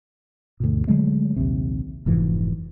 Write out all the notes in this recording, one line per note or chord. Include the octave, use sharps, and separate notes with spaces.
D2 G2 B2
D3 F#3 G#3 A3
A#1 D#2 C3
F1 G#2 E3 F3